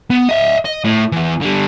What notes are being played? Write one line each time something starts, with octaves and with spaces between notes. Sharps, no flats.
B3
D#5 E5
D#5
A2
E3 B3
D3 G3